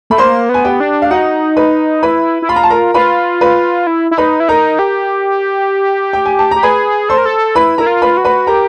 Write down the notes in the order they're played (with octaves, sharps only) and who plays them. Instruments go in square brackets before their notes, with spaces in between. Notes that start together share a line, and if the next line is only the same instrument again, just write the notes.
[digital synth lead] A3 [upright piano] B5
[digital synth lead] A#3 [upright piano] C5 C6
[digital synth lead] B3
[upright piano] G#5
G4 G5
[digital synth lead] D4
[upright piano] F5
[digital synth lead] D#4 [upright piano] F#4 F#5
[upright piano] B4 B5
[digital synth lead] E4 [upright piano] B4 B5
[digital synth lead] E4
[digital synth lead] F4 [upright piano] B5
[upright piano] A#5
A5
A#4 A#5
[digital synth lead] F4 [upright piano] B4 B5
[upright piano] B4 B5
[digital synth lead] E4
E4
[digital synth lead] D#4 [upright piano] B4 B5
[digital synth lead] E4
[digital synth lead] D#4 [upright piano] A#4 A#5
[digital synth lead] G4
[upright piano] G5
G#5
A5
[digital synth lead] G4 [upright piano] A#5
[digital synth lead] G#4 [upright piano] B4 B5
[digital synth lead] A4 [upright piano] C5 C6
[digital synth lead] A#4
A4
[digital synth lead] E4 [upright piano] B4 B5
[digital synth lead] E4 [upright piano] A#4 A#5
[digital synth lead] F4
[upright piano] B4 B5
[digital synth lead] F#4
[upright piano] B4 B5
[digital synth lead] G4 [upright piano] A#4 A#5